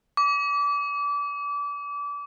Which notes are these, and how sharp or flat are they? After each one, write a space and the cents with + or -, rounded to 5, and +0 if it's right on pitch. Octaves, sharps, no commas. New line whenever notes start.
D6 -30